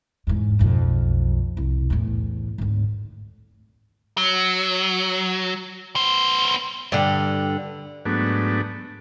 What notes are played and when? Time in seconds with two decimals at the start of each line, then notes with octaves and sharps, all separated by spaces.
0.27 E2 G#2
0.59 B1 F2
1.57 C2
1.90 E2 A2
2.58 G#1 D2
4.17 F#3
5.96 B3 C5
6.92 G2 D3
8.05 G#2 F#3 A3 B3 D4